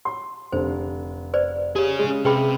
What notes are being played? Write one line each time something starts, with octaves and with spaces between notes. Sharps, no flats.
C6
F1 D3 C5
B4 C5 D5
G4 G#4 C#5
C#3 G#3
C3 G#4 B4 G5 B5